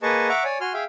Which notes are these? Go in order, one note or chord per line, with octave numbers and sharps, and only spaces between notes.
A#3 G#4 B4 D#5 A5 C#6
E5 F#5 A#5 C#6 D6
C#5 D5 G#5
F#4 G#5 C6 F6
G#4 E5 F5 G5